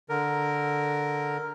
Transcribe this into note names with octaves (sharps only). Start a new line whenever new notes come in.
D3 A#4